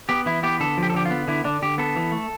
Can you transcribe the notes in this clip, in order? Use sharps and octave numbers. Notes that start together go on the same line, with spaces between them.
B3 G4
E3 E4
B3 G4
D3 A4
F3
G4
A4
D3 G4
B3 F4
D3 E4
D3 D4
D3 G4
B3 A4
E3
A3